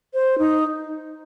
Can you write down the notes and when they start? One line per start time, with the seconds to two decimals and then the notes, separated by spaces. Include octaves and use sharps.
0.14 C5
0.38 D#4